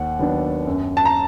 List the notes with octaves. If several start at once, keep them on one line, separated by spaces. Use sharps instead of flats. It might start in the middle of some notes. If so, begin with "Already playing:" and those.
Already playing: D#2 F#5
D#3 F#3 B3 D4
F#2
A5
A#5